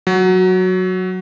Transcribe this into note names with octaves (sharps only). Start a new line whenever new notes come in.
F#3